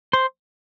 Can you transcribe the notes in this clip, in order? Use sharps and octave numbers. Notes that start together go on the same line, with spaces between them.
C5